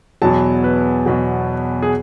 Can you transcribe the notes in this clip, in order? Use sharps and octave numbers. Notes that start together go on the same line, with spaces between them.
E2 B2 F#3 A5
B4
E2 B2 F#3
G#4